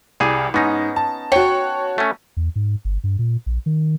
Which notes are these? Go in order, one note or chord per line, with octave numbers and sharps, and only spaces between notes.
C2 G3 G#4
G#2 B3 C#4 D#4 A#6
A5
F#4 C#5 G5 C#6
A3 C#4
E2
G#2
G1
G2
A#2
A#1
D#3